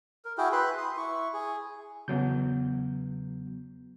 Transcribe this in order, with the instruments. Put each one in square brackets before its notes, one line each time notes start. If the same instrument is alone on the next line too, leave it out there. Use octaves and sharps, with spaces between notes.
[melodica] A#4
E4 F#4 G#4 G5
B4 E5 B5 C6
C6 D#6
E4 C#6
G#4
[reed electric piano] E2 F#3 G6 [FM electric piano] C#3 B3